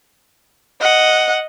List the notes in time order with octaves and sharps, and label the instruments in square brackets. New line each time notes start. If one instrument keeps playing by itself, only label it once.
[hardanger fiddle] D#5 [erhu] F#5